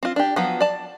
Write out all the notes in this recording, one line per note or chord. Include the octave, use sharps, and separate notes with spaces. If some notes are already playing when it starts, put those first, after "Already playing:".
C4 F4
D4 G4
F3 F#3 B3
D5 A5